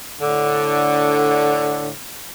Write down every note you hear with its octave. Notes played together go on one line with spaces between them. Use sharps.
A2 D3